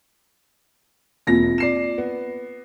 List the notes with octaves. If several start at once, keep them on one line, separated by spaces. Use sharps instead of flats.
E1 A#3 C4 F4 A#6
D5 C7 E7
B3